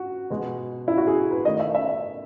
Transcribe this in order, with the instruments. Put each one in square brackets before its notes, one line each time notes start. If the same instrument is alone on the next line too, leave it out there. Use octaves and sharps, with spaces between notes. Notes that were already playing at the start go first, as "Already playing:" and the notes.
Already playing: [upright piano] F#4
B2 G#3 B3
E4
F#4
G#4
B4
D#3 A3 D#5
E5
E5
E5